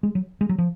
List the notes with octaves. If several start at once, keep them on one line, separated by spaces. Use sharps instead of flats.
G#3
F#3
G#3
F#3
F3